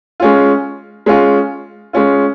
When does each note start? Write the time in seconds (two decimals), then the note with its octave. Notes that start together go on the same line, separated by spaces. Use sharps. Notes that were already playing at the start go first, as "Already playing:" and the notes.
0.20 G#3 C#4 F4
1.06 G#3 C#4 F4
1.93 G#3 C#4 F4